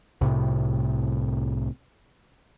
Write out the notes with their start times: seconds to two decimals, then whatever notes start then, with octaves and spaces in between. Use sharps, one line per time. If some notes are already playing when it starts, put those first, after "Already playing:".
0.21 C2 A2 C3